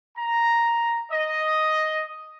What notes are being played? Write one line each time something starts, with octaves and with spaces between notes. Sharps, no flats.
A#5
D#5